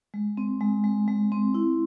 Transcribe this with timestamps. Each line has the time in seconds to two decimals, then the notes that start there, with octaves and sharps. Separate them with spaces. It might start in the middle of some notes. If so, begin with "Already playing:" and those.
0.14 G#3
0.37 C4
0.61 G#3
0.84 G#3
1.08 G#3
1.32 C4
1.54 E4